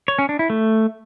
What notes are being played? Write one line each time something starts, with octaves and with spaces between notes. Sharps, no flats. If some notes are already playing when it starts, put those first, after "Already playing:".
C#5
C#4
D4
E4
A3